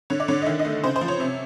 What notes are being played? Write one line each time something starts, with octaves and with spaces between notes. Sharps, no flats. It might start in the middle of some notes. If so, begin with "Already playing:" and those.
D3 C#5
D5
D3 C#5
D#5
D#3 E5
D#5
A3
C#3 C5
C5
F3
C#5
C3